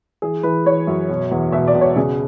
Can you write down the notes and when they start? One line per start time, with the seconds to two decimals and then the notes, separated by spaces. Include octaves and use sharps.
0.22 E3 G#4
0.43 E3 B4
0.66 E3 C#5
0.87 F#2
1.09 B2
1.31 E2
1.52 B2 E5
1.68 D5
1.75 B2
1.81 C#5
1.96 C#3 G#4